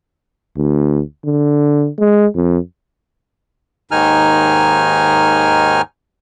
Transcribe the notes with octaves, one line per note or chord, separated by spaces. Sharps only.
D2
D3
G#3
F2
D#2 G#2 D#3 D#4 G#5 F6